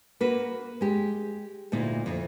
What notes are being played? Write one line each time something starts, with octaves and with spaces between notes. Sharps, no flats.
A#3 F#4 B4
G#3 G4
D2 A#2 D#4 E4
F2